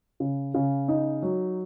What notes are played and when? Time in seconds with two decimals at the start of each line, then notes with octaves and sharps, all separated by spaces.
0.20 C#3
0.54 C#3
0.88 D#4
1.22 F#3